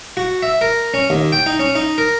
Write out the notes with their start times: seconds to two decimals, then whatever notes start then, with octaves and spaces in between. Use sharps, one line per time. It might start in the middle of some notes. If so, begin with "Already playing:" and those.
0.17 F#4
0.43 E5
0.61 A#4
0.94 C#4
1.10 D#2
1.32 G5
1.46 D#4
1.60 C#4
1.75 D#4
1.98 A#4